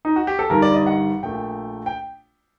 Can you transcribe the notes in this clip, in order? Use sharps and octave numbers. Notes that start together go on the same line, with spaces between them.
D#4
F#4
G4
A4
G1 G2 D#3 G3 A#4
D5
D#5
F#5
A#1 A#2 A3 G5
G5